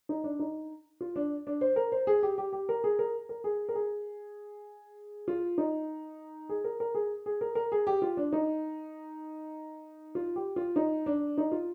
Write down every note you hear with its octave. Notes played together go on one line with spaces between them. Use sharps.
D#4
D4
D#4
F4
D4
D4
C5
A#4
C5
G#4
G4
G4
G4
A#4
G#4
A#4
A#4
G#4
A#4
G#4
F4
D#4
G#4
A#4
A#4
G#4
G#4
A#4
A#4
G#4
G4
F4
D4
D#4
F4
G4
F4
D#4
D4
D#4
F4